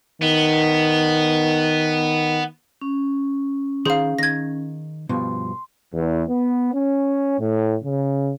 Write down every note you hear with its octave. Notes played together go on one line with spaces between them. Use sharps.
D#3 B3
C#4
D#3 G#4 C5 F5
D#3 G#6 A#6
G2 B2 F3 C6
E2
B3
C#4
A2
C#3